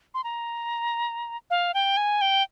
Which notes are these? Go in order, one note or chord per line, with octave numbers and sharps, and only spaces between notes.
C6
A#5
F5
G5
G#5
G5